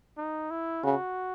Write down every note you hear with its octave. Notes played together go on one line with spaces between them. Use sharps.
D#4
E4
C#3 F#4